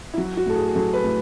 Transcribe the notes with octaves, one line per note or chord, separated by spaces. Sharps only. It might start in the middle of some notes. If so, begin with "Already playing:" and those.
E4
F#3 F#4
F#4
A2 A4
G#4
G#4
F#3 A4
B4
A2